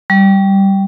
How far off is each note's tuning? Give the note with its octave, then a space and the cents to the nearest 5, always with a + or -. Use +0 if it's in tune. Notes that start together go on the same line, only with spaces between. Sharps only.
G3 -5